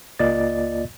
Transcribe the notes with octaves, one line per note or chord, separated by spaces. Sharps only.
C#2 A#3 F4 D5 D#5 A6